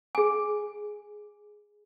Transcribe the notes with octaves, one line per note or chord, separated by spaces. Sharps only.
G#4 G#5